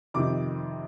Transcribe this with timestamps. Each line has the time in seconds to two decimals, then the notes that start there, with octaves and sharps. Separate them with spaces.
0.14 F2 C3 D#3 D6